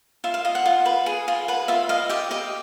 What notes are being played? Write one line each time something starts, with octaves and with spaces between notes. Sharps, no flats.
F4 E5
F5
F4 D#5
F#5
F4
B4
G#4
F4
B4 F#5
F4 E5
D#5 F5
G4 E5
G4 D#5